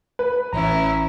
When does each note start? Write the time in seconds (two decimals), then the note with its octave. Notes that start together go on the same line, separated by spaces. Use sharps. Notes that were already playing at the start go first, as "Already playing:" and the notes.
0.19 B4
0.53 A1 C#4 E4 A#5